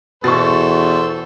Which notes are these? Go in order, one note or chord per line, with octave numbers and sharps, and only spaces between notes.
E2 B2 A4 C5 C#6 A6